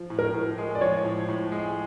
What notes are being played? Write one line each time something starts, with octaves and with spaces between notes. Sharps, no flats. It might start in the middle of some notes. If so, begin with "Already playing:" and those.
Already playing: F3
A2
A#4
A2
G#3
D5
F3 C#5
A2
A2
G#3